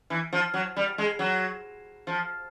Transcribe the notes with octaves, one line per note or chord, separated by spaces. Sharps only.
E3
F3
F#3
G3
G#3
F#3
F3